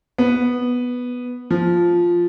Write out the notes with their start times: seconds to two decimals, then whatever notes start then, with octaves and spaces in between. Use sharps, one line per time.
0.18 B3
1.51 F3